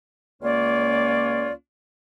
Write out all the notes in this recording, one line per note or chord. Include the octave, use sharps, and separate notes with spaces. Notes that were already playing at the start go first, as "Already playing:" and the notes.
C#2 A#3 C#4 F4 C#5 D5